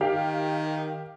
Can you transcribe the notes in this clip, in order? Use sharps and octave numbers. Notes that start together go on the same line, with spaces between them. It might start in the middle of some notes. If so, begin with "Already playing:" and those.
D#3 G4 F5